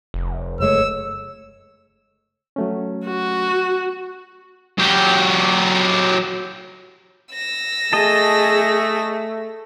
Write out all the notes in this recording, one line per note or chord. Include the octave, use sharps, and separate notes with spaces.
F1
F#1 G#3 A3 C#5 E6
F#3 A3 C#4
F#4
F#3 G4
E6 A#6
A3 G#4 D#5 A5